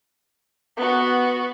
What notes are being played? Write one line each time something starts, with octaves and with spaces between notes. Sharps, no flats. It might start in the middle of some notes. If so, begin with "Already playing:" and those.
B3 F#4